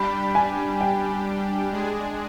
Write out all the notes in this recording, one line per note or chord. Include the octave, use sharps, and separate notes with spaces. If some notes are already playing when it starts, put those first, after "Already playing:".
Already playing: G3 D4 G4 B5
G#5
G5
G#3 D4 G#4